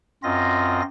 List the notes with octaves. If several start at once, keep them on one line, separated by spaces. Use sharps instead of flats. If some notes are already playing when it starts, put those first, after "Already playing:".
F#2 C4 F4 D#5 A#6